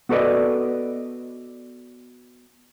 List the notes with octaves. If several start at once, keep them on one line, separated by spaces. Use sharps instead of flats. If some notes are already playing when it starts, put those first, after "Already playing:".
B3 F#4 A4 B4 D5 D#5